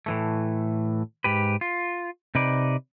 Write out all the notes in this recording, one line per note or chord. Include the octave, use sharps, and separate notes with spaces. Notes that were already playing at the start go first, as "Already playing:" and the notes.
A2 E3 A3
G#2 G4 B4
F4
C3 D#4 B4 D5